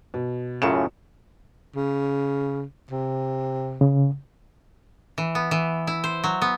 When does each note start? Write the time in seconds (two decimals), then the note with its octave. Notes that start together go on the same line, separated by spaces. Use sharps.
0.14 B2
0.62 F#2 A2 C#3 F4 C#7 E7
1.76 C#3
2.91 C3
3.81 C#3
5.18 E3
5.35 B3
5.51 E3
5.87 E4
6.04 C5
6.24 F#3
6.42 B3